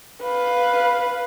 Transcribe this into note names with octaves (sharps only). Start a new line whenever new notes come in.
B4 F5